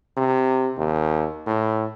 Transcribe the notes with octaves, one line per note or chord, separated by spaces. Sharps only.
C3
D#2
A2